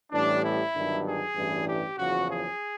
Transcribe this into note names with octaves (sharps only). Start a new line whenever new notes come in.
A1 A2 E3 G3 D4
E4
G1 G2 D#3 F#3
G#4
A1 G2 E3 G3
G4
F#1 E2 C#3 F3 F#4
G#4